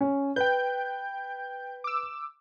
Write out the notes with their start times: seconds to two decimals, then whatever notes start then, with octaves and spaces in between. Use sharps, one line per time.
0.01 C#4
0.36 B4 G5 G6
1.84 D6 E6